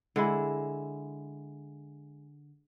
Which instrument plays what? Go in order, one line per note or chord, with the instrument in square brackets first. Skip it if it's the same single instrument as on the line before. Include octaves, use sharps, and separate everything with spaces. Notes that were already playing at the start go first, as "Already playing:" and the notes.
[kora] D3 G#3 E4